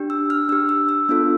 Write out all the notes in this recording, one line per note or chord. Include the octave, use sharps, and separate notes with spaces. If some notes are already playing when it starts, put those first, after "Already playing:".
Already playing: D4 G4
E6
F6
D4 G4 E6
E6
E6
B3 D4 F4 A4